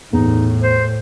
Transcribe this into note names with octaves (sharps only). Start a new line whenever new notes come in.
E2 A2 D#4
C5